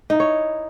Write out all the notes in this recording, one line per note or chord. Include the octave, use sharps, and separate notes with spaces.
D#4 E4 C#5